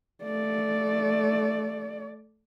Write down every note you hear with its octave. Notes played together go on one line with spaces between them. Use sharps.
A3 D5